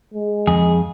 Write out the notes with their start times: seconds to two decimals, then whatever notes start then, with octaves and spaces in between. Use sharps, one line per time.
0.14 G#3
0.47 F2 G#4